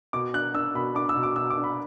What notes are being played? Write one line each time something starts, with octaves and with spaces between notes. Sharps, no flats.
B2 D6
D4 F#6
D4 E6
B2 B5
D4 D6
E6
B2
D6
B2 E6
D6
D4
B5